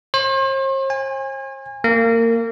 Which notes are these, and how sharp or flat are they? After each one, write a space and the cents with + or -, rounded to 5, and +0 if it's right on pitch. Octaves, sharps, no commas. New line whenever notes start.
C5 +45
G#5 -30
A#3 -25